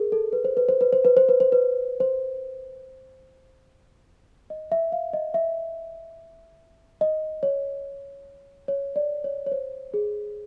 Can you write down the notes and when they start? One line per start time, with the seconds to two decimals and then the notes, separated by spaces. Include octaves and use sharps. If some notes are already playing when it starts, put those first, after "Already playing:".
Already playing: G#4 A#4
0.12 A4
0.33 B4
0.44 C5
0.57 B4
0.69 C5
0.81 B4
0.93 C5
1.05 B4
1.17 C5
1.29 B4
1.40 C5
1.52 B4
2.00 C5
4.50 D#5
4.72 E5
4.92 F5
5.13 D#5
5.34 E5
7.01 D#5
7.43 C#5
8.68 C#5
8.96 D5
9.24 C#5
9.46 C#5
9.52 C5
9.94 G#4